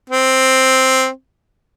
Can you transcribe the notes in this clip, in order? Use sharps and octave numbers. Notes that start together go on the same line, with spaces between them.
C4